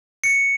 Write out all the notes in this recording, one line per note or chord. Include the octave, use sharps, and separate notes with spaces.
C#7